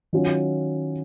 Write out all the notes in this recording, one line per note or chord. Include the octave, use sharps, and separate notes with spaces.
D#3 F#3 C#4 F4